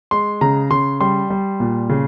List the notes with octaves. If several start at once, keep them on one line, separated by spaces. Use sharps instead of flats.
G#3 C6
C#3 A#5
C#3 C6
G3 C6
G3
A#2
C#3